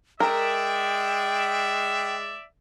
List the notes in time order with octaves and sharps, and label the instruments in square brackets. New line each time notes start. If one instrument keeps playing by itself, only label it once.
[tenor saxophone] G#3 [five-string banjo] A#4 [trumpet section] D5 E5 [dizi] G5